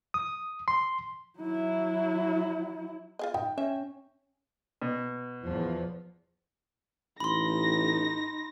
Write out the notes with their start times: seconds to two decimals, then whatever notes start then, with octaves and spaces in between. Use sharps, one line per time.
0.14 D#6
0.68 C6
1.40 F#3 E4
3.19 F4 G#4 D#5
3.34 D#4 G5
3.58 C#4 E5
4.82 B2
5.44 E2 F3
7.20 A1 D#4 B5 C6 A#6